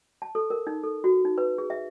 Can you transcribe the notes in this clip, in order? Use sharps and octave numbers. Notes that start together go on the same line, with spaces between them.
A5
A4
A#4
D#4
A4
F#4
D#4
B4
G#4
E5